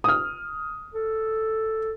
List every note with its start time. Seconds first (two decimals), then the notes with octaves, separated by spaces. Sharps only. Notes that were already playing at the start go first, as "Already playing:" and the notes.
0.04 D#6 F6
0.94 A4